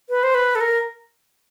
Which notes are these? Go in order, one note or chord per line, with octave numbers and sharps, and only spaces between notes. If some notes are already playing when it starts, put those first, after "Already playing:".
B4
C5
B4
A4
A#4